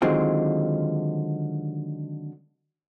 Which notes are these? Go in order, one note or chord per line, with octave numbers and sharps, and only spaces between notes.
D3 D#3 F#3 G#3 C4 F4